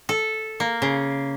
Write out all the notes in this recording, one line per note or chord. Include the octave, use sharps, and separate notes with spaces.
A4
A#3
C#3